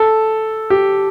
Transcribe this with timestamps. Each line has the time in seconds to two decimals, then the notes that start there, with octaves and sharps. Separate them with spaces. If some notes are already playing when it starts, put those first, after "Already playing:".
Already playing: A4
0.70 G4